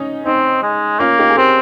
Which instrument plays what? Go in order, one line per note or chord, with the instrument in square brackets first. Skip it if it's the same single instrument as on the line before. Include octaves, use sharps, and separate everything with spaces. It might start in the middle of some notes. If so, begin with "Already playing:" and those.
Already playing: [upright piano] C#4 D#4
[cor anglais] C4 [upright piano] D#4
[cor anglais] G#3
[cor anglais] A#3 [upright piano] C#4 F4
[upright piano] D#4 G4
G#4
[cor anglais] C4 [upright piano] G4 A#4